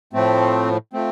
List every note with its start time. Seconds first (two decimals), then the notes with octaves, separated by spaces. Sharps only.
0.13 A2 F3 A3 C4
0.93 F3 A3 C4